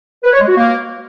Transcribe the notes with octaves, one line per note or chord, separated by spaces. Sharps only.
B4
C#5
G#3
F#4
A#3